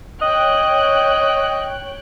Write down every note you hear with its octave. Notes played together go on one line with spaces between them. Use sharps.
C#5 D#5 G5 F#6